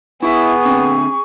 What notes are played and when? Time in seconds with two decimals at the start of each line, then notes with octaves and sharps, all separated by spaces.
0.23 B3 E4 G#4 E5 C#6
0.65 D3 C4